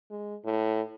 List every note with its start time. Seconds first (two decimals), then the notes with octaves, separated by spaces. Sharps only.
0.11 G#3
0.45 A2